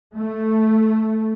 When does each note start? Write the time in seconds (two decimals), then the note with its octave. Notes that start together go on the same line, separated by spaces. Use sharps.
0.16 A3